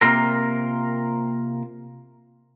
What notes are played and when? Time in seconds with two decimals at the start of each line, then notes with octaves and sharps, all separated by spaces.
0.01 C3 D#3 A#3 F4 A#4